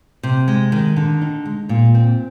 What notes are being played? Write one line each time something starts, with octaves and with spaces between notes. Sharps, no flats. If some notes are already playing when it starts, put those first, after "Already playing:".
C3
G#3
D#3
D3
D#4
G#3
A#2
C4